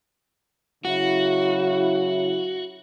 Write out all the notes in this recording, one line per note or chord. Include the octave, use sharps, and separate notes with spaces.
C#3 F#3 E4 F#4